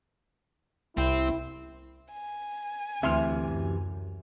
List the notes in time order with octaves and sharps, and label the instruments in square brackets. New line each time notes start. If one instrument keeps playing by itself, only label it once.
[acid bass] C2 [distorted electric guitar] C4 [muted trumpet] E4
[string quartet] G#5
[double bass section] D2 [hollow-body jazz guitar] C3 E3 [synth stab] E5 C6 F6
[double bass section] F#2